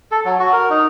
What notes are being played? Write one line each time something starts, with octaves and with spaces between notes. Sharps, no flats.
A4
F#3
F#4
A#4
D#4